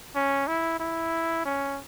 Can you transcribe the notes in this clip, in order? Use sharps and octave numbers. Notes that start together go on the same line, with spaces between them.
C#4
E4
E4
C#4